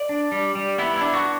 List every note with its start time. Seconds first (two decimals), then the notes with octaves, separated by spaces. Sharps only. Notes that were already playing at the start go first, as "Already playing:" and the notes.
Already playing: D5
0.09 D4
0.32 G3
0.55 G3
0.78 B3 E4
0.96 E4
1.01 D4
1.14 F#4